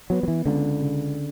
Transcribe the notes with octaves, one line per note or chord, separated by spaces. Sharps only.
F#3 B3
F#3
E3
C#2 D3
C#3